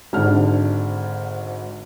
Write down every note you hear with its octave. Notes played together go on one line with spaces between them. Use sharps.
G#1 G#2 D3 D4 F6